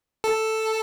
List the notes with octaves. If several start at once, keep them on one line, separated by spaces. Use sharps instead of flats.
A4